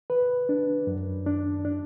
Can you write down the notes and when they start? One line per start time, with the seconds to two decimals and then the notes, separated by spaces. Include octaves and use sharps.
0.10 B4
0.49 D4
0.87 F#2
1.26 D4
1.65 D4